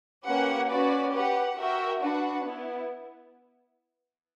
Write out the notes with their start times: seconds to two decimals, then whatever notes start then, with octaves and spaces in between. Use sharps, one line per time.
0.24 A#3 C#4 G4 B4 F#5
0.68 C#4 F#4 B4 D5
1.13 G4 B4 F#5
1.57 F#4 A#4 E5 G5
2.01 D4 F#4 B4 F#5
2.45 B3 E4